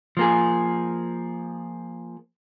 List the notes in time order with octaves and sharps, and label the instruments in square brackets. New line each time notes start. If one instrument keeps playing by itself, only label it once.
[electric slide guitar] F3 A#3 G#4